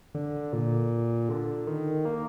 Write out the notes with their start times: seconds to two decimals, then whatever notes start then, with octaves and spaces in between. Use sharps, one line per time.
0.15 D3
0.53 A#2
1.29 D3
1.67 D#3
2.05 A#3